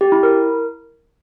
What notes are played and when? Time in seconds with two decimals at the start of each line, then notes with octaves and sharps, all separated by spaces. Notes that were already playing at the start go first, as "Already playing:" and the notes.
0.01 G4
0.12 E4
0.23 A#4